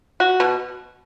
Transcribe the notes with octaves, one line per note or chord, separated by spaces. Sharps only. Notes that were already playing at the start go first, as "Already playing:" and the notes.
F#4
B2